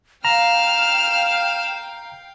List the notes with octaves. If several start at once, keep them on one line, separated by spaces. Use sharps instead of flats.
F5 G5 A#5 F6 E7